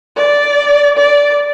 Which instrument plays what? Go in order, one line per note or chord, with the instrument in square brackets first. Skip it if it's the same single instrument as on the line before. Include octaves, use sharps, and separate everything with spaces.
[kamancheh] D5
D5